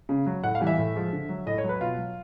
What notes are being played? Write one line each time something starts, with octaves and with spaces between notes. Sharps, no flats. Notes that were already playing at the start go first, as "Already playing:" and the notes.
C#3
F#3
A2 F#5
F5
E3 G3
E5
A2
F3 G#3
D3
F#3
A2 D#5
C#5
F#3
B4
B2 F4
F#3